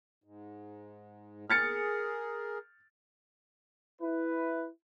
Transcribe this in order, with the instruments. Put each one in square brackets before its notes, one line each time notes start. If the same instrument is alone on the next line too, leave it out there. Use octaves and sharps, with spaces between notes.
[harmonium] G#2
[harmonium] G#4 A#4 [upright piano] F6 A6 C#7
[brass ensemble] E4 B4